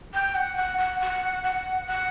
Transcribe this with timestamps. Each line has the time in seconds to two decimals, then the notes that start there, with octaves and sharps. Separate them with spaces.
0.14 G5
0.35 F#5
0.57 F#5
0.78 F#5
1.00 F#5
1.44 F#5
1.87 F#5